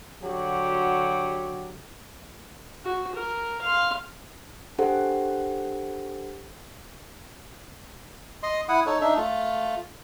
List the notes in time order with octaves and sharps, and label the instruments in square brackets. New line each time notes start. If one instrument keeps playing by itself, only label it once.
[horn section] D3 F#3 F#4 G4
[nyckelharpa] F#4
A#4
F5 C6
[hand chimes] D4 G4 A4 C5 F#5
[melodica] D#5 C6
E4 F#5 D#6
D#4 A4 C#5
D4 D#4 E5
A3 F4